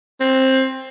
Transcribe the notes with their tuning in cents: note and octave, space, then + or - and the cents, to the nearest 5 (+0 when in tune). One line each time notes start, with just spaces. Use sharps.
C4 +15